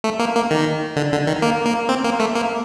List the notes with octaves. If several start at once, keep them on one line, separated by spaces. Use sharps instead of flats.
A3
A#3
A#3
D#3
D3
D3
D#3
A#3
A#3
C4
A#3
A3
A#3